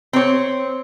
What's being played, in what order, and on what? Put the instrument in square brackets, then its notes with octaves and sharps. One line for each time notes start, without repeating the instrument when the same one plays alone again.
[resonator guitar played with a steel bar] C4 C#5